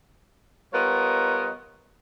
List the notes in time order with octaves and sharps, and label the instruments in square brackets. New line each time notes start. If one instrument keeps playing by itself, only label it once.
[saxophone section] G3 B3 F4 A#4 C#5 D#5